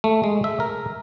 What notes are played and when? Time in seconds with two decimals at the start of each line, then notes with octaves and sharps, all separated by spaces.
0.04 A3
0.24 G#3
0.44 E5
0.60 A#4